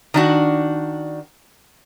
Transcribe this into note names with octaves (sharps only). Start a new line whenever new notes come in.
D#3 D4 F#4